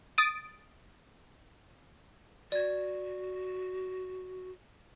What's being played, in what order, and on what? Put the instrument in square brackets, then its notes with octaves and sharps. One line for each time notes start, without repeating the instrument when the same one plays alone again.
[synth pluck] D#6 A6 D7
[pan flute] F#4 [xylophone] D5 G#6